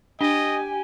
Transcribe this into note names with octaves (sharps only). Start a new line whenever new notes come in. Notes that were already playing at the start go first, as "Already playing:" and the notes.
D4 G4 D#5 G#5